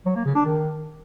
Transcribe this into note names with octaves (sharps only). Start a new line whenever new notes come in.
F#3
A#3
C#3
D4
D#3